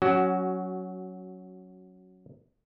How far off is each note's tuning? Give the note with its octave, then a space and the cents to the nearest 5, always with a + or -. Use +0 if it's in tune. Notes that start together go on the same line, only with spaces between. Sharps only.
F#3 +0 C#4 +0 F#4 +15